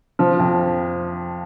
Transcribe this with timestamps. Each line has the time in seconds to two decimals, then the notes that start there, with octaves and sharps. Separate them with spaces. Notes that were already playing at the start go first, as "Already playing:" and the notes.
0.19 F3
0.39 F2